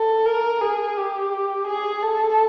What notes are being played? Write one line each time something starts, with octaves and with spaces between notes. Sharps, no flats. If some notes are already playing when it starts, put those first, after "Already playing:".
Already playing: A4
A#4
G#4
G4
G#4
A4